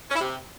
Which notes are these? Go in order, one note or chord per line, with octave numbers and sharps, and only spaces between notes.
C#4
E4
C3